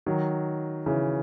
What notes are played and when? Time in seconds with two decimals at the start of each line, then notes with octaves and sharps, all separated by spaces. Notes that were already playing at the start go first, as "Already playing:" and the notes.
0.06 D#3 F#3
0.86 C#3 E3